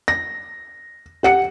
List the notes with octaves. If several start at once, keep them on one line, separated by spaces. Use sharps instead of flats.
A#6
G4 F#5 C#7